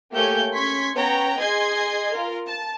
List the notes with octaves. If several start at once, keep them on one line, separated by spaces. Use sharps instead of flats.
A3 A#3 G4 C#5 G#5 G6
C#4 C6 C#6 G#6 B6
B3 C#4 B4 C#5 G5 A#5
G#4 D#5 G#5 C6 G#6 C7
F4 A#4
A5